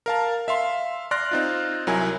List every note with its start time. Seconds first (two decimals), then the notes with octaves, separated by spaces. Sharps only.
0.06 A#4 F5 A5
0.48 E5 F5 C6
1.11 D5 C6 F6 F#6 A#6
1.31 C4 D#4 F4
1.87 C2 F#3 E4 A#4 G#5